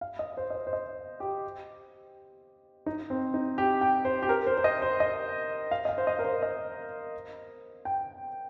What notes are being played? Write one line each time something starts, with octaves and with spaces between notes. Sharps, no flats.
F5
D#5
C5
D#5
C5
C5
D#5
G4
D#4
C4
D#4
G4
G5
C5
G4
A#4
C5
C5
D#5
C5
D#5
F5
D#5
F5
C5
D#5
A#4
C5
D#5
G5